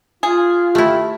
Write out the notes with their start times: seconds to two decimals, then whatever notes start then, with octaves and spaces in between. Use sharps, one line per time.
0.23 F4 G#4
0.75 A3 E4 G4